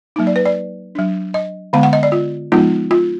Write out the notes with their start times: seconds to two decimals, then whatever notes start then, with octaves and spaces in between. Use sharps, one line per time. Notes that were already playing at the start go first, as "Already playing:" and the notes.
0.16 F#3 A#3 D#4
0.27 D5
0.36 B4
0.46 D5
0.95 F#3 D4
1.34 D#5
1.73 D3 G#3 B3 F5
1.83 F#5
1.93 D#5
2.03 D5
2.12 F4
2.52 F3 G#3 B3 D#4 F4
2.91 F4